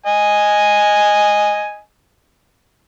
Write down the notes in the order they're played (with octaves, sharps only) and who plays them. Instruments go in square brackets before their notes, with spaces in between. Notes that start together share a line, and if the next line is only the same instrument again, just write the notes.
[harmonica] D#5 G#5